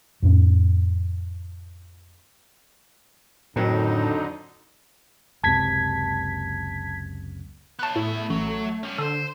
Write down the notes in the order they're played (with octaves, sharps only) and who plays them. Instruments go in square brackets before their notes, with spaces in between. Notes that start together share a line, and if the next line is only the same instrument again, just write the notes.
[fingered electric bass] F2 A2 C#4
[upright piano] F2 D#3 F#3 [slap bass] A2 [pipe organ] D3 D#4
[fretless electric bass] F#1 C#2 C3 [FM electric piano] A5 G#6 B6
[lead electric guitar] B3 C#5 [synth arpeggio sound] A5 F#6
[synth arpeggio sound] A2 [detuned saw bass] A3 [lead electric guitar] B3 E4
[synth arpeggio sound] A1 [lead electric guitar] F#3
[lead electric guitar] G2 C#4
[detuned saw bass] D3 [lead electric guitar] G#4 C5 [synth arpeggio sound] A4